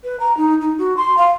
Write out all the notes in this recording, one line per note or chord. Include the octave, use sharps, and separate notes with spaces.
B4
A#5
D#4
D#4
F#4
C6
F5